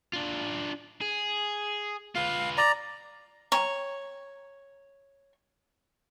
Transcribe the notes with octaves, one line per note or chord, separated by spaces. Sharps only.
D4 F4
G#4
F4 B4 F5
D5 A#5
C#5 G5 A#5